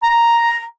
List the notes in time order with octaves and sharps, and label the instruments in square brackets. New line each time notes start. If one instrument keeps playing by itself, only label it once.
[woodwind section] A#5